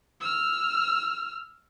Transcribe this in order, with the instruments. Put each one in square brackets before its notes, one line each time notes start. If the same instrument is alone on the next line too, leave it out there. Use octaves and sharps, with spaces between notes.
[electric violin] E6 F6